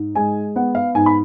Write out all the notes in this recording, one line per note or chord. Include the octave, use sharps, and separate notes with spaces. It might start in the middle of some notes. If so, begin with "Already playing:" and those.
Already playing: G#2
G#3 G#5
B3 F#5
F5
G#2 G#5
B5